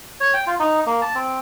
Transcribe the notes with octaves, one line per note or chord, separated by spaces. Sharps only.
C#5
G5
F4
D#4
A#3
A5
C4